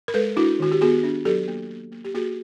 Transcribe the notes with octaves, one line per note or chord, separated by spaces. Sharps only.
A#4
G#3 A4 B4
D4 E4 F#4
D#3 F#4
G4
B3 F#4 G#4
D4
F#3 G4 A4
A#3
A#3
A#3
G4
A#3 F#4 G#4